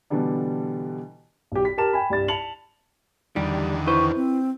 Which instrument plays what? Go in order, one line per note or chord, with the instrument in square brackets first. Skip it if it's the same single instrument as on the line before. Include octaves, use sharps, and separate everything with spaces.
[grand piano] B2 D3 E3 G3 D4
[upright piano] B1 G4
B6
G4 A#4 A5 E7
G5 G#5 B5
C2 G2 A6
A5 C#7 F7 F#7
[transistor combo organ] E2 D3 D#3 [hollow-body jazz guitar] G3 G4
[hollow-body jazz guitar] E4 B4 C5 [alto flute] C#6
[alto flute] C4